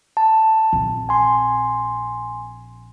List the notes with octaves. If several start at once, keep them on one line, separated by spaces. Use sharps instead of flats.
A5
A#1 C4
G#5 C6